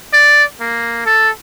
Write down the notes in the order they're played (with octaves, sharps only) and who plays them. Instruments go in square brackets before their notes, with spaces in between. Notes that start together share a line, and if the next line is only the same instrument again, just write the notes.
[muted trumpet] D5
A#3
A4